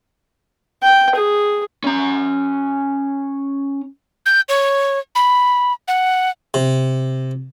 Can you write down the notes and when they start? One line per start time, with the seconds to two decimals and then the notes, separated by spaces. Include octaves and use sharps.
0.83 G5
1.15 G#4
1.84 C#4 A#5
4.26 G6
4.49 C#5
5.15 B5
5.88 F#5
6.54 C3